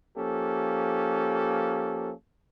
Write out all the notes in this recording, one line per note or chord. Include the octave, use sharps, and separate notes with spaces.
F3 A#3 C#4 G4 A4